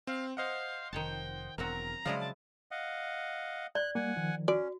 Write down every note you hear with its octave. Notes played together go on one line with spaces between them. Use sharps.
C4 F5
C5 D#5 F5 F#5
F1 D#3 C#5 G5 A5
E1 F#3 C4 F#4 A#4 A#5
C#3 F3 F#3 G#3 E4 D5 F5
A5
D#5 F5 F#5
D5 F#6
G3 A#3 F#5 G#5
D#3 F3
C#4 F#4 D5